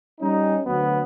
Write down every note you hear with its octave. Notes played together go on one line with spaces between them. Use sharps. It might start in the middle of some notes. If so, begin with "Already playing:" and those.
G3 C#4 D#4
D2 F#3 B3